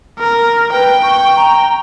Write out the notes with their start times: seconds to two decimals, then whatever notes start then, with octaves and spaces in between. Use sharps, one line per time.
0.19 A#4
0.72 B4 G5
1.02 C#6
1.36 A#5